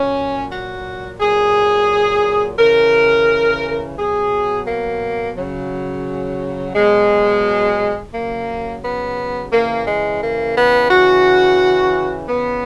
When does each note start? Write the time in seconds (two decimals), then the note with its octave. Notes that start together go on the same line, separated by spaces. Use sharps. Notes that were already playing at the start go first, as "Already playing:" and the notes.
Already playing: A#2 F#3 C#4
0.51 F#4
1.20 A#2 F#3 G#4
2.59 C#3 E3 A#4
3.98 B2 F#3 G#4
4.67 A#3
5.37 C#3 F#3
6.74 B2 F#3 G#3
8.13 C#3 F#3 A#3
8.82 B3
9.52 C#3 E3 A#3
9.87 G#3
10.21 A#3
10.56 B3
10.91 C#3 E3 F#4
12.29 C#3 E3 B3